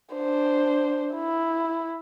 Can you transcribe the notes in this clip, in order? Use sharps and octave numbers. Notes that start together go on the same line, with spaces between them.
D4 C5
E4